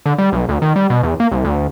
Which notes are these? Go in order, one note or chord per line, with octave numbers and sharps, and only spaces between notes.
D3
G3
B1
D2
D#3
G3
B2
E2
A#3
C2
D2